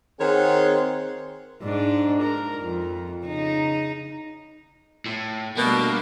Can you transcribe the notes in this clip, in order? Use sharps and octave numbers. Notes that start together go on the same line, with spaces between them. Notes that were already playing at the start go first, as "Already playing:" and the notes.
D#3 C4 G#4 C#5 F#5 C6
G#2 D4
A#4
F2
C#3 D#4
A2
B2 G3 A3 A#3 D4